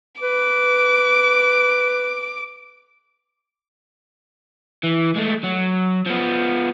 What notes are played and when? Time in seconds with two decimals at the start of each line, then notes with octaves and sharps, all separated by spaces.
0.21 B4 D6
4.83 E3
5.16 G#3 A3
5.43 F#3
6.07 F3 B3